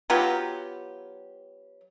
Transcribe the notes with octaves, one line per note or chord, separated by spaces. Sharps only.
F#3 B3 F4 G4